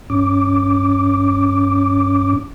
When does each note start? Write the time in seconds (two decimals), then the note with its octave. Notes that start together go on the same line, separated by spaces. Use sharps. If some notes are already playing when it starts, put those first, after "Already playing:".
0.10 G2 C#4 D6